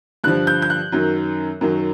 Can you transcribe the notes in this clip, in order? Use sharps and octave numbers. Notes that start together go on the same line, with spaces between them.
G2 D3 F3 F#6
G6
G6
F#6
F#2 D#3 F#3
F#2 D#3 F#3